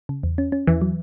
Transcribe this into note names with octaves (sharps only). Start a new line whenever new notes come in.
C#3
E2
C#4
C#4
E2 E3
F#3